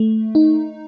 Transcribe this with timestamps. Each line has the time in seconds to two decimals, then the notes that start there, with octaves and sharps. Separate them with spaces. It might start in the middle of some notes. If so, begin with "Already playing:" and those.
Already playing: A3
0.35 D#4